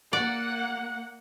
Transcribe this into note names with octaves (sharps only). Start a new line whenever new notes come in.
A#3 D5 F#5